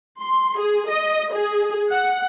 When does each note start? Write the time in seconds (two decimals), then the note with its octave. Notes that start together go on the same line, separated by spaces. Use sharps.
0.20 C6
0.58 G#4
0.88 D#5
1.32 G#4
1.91 F#5